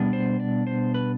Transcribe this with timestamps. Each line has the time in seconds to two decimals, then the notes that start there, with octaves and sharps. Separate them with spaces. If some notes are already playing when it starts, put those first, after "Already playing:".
Already playing: B2 G3 B3 D4
0.13 C5
0.40 D5
0.67 C5
0.94 B4